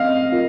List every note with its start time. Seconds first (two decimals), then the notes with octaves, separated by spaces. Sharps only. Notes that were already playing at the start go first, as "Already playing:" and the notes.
Already playing: C4 D#5 F5
0.32 F4 A#4